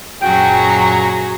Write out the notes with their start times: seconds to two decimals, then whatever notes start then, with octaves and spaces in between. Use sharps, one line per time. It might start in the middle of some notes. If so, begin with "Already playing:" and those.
0.21 F#2 A#2 F#3 F#4 G#4 G5
0.68 A#5